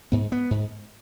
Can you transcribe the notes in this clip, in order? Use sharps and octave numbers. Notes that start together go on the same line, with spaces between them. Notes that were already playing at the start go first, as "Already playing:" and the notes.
G#2 B3
B3
G#2